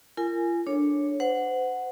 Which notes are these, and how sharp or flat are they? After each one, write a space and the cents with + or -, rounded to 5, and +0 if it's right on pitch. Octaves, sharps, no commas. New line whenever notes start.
F4 -40 A#4 -20 G#5 +0
D4 +0 A4 -15 C#5 +0
C5 -35 F#5 +0